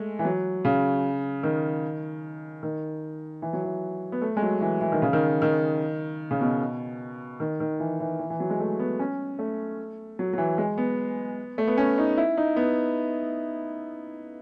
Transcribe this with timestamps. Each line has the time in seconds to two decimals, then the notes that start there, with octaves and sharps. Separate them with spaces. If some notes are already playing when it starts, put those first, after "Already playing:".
Already playing: G#3 A3
0.19 E3
0.25 F#3
0.65 C#3
1.43 D#3
2.63 D#3
3.42 E3
3.53 F#3
3.64 E3
4.12 B3
4.22 A3
4.37 G#3
4.42 F#3
4.61 E3
4.81 E3
4.92 D#3
5.02 C#3
5.13 D#3
5.42 D#3
6.31 C#3
6.41 B2
7.40 D#3
7.60 D#3
7.80 E3
8.00 E3
8.19 E3
8.30 E3
8.40 F#3
8.50 G#3
8.60 A3
8.79 B3
8.99 C#4
9.39 A3
10.19 F#3
10.33 F#3
10.38 E3
10.58 G#3
10.78 B3
11.58 A3
11.67 B3
11.78 C#4
11.98 D#4
12.17 E4
12.37 D#4
12.56 B3